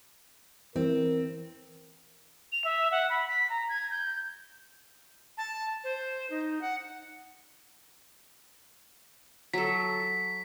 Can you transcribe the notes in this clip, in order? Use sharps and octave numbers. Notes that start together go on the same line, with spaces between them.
E3 C4 A#4
F7
E5
F#5
B5
B6
A#5
G#6
G6
A5
C5
D#4
F#5
F#3 A4 B6